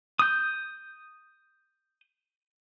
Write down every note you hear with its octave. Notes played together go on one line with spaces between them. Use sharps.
D#6 G6